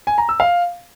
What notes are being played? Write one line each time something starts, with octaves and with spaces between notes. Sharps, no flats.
G#5
A#5
E6
F5